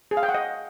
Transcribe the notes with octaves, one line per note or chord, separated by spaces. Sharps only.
G#4
F5
G5
F#5
D#5